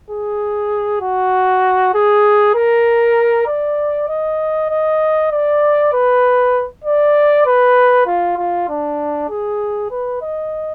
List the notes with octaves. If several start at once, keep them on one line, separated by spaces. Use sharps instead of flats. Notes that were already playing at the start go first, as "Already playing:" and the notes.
G#4
F#4
G#4
A#4
D5
D#5
D#5
D5
B4
D5
B4
F4
F4
D4
G#4
B4
D#5